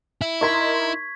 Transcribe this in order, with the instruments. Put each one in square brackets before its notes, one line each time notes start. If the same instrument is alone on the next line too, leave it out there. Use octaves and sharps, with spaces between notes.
[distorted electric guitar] E4
[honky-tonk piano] D#4 A#4 C6 [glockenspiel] C#6 G#6 B6